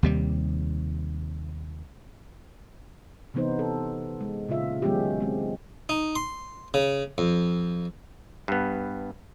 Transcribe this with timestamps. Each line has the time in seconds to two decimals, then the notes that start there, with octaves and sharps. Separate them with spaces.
0.03 D#2 C3 G3
3.34 C3 E3 B3 D#4 C5
3.59 A4
4.21 G#3
4.49 A#2 C#3 F4 E5
4.82 D#3 F#3 G#3 B3 C#4 G4
5.20 G#3 C4
5.89 D#4
6.16 C6
6.74 C#3
7.18 F2
8.48 G2 B3